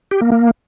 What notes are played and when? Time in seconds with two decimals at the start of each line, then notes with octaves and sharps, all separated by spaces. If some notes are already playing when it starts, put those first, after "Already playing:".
0.11 G4
0.21 A#3
0.32 A#3